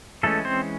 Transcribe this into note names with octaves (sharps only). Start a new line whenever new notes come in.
E3 G#3 A3 C#4 A4
C4 C5